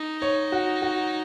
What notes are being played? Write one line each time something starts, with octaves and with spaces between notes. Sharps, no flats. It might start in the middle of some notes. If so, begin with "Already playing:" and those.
Already playing: D#4
C#5
F#4
F#4